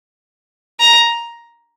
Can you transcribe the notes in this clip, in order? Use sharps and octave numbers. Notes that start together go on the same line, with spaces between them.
A#5